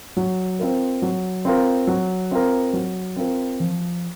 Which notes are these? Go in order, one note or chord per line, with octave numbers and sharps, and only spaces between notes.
F#3
C4 F4 A#4
F#3
C4 F4 A#4
F#3
C4 F4 A#4
F#3
C4 F4 A#4
F3